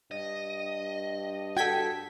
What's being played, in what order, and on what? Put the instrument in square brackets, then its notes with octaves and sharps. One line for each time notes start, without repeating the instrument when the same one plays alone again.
[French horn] G2 [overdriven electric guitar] D#5
[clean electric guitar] F#4 A4 [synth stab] G5 G#6 B6